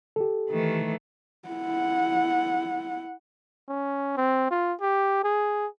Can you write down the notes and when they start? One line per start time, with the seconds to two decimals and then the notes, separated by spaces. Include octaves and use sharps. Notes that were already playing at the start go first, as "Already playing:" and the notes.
0.16 G4 A4
0.50 D#3 E3 A3
1.48 E4 F#5
3.69 C#4
4.17 C4
4.51 F4
4.81 G4
5.24 G#4